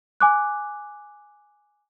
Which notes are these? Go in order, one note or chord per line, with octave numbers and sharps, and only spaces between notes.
G#5 D6 F#6